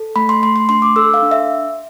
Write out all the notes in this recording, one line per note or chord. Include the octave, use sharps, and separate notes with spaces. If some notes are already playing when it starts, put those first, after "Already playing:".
Already playing: A4
A3 B5
C6
A3 C6
C6
D4 C6
D6
A4 E6
F5
D4
E5